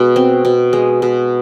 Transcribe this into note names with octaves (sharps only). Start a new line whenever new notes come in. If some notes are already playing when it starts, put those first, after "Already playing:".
Already playing: B2 G#3
C4
B2
G#3
B2